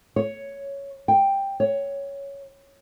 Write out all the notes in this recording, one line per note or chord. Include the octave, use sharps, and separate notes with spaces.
C#5
G5
C#5